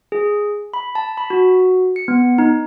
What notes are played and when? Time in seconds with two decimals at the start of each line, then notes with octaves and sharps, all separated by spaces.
0.12 G#4
0.74 B5
0.95 A5
1.18 B5
1.30 F#4
1.96 C#7
2.08 B3
2.38 D#4